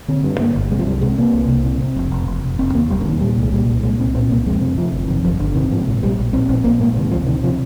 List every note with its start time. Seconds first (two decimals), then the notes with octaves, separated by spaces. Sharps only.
0.08 D3 C4
0.23 G2
0.39 G2 A#3
0.55 G1
0.71 C3 G#3
0.79 F3
0.86 C2 G3
1.02 C3 G#3
1.18 C3 A#3
1.33 C2
1.48 C2
1.65 C3
1.81 C3
1.97 F1
2.11 F1
2.27 F1
2.43 F1
2.58 F1 C4
2.74 D#2 A#3
2.90 F1 G3
3.01 D3
3.05 D#2 D#3
3.21 A#2 G3
3.37 C2
3.43 G#3
3.53 A#2 G3
3.68 C2
3.83 A#2 G#3
4.00 C2 C4
4.15 A#2 C4
4.30 C2 A#3
4.46 F2 G#3
4.61 C3
4.77 C3 F3
4.92 G1
5.08 F2 D#3
5.24 G1 F3
5.40 G1 D3
5.55 C3 D#3
5.71 G#2 F3
5.87 A#1
6.03 A#1 G3
6.18 A#1
6.33 A#1 C4
6.49 A#1 C4
6.64 A#1 A#3
6.80 G#2 A#3
6.96 C3 D#3
7.11 D2 F3
7.27 C3 D#3
7.43 C3 F3